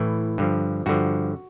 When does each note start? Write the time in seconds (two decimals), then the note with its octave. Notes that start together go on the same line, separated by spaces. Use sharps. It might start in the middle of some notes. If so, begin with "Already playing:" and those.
Already playing: A2 E3
0.38 G2 D3 F3
0.86 G2 D3 F3 F#4